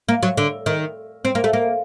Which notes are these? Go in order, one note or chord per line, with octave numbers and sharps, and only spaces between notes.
A#3
F#3
D3
D#3
C4
A#3
A3
A#3